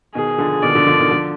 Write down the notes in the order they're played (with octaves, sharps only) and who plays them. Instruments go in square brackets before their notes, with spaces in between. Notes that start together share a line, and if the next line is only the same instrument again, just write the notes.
[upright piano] B2 D#3 [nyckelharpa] G#4
[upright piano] D3 F3
[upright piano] B2 D#3 [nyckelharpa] D5
[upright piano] D3 F3
D3 F3
B2 D#3
D3 F3